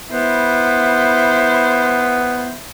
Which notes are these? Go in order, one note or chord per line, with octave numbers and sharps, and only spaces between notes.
B3 E4 C5